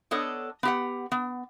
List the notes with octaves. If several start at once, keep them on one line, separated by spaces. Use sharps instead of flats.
B3 D4 A4 C#5 D#5
B3 G4 F#5
B3